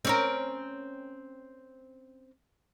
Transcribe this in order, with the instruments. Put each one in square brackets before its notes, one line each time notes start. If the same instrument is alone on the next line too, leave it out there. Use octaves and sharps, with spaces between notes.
[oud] C4 C#4 A#4